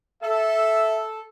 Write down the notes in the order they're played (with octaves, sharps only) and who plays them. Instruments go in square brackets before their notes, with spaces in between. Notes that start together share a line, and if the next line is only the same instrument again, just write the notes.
[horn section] A4 [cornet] E5